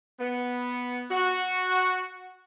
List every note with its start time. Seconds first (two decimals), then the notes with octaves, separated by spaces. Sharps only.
0.19 B3
1.10 F#4